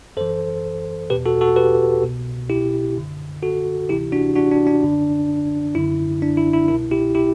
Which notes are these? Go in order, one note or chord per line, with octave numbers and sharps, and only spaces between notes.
F#2 E3 A4 C5
E2 B2 G4 B4
F#4 A4
F#4 A4
G4 B4
C2 B2
E4 G4
F#2 D3
F#4 A4
D2 C3 E3 E4 G4
D4 F#4
D4 F#4
D4
D4
F#2 D3
F#2 D3 E4
D4
E4
E4
C2 B2 E4
E4 G4
E4 G4